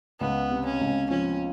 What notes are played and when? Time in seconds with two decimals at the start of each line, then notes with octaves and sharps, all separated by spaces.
0.20 C#2 B3
0.51 C3
0.66 C#4
0.81 C#2
1.10 F3 C#4